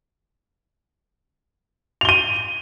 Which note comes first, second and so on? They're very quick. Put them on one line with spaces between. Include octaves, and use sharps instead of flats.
F7 G7 D#7